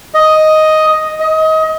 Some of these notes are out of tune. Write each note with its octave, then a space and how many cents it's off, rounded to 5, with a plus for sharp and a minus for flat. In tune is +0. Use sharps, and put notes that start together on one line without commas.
D#5 +5
D#5 +25